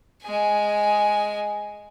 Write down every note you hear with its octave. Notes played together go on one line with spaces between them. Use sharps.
G#3 G#5